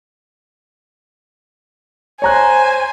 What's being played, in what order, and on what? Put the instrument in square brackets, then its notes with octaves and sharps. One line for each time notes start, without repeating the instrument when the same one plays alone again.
[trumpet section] C5 [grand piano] C#5 A#5 F#6 [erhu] G#5